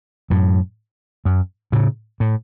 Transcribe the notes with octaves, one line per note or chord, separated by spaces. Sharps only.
F#2 A2
F#2
A2 C#3
A2